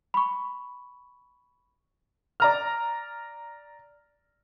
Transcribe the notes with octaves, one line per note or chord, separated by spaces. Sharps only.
B5 C#6
D5 A#5 F6